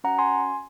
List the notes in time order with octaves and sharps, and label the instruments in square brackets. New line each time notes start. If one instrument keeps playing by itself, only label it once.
[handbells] C#4 F#4 F#5 A#5
G#5 C6